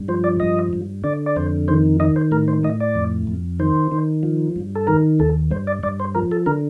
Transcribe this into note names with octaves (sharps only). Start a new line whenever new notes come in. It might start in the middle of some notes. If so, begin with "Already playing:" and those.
Already playing: G2
F3 C5
D5
G2 D#5
G2
D3 D5
D5
F2 C5
D#3 C5
D#3 D#5
C5
A2 A#4
C5
A2 D#5
D5
F2
F2
D#3 C5
D#3
F3
G2
A4
D#3 A#4
D#2 A4
G2 C5
D5
G2 D5
C5
F3 A#4
A4
D3 A#4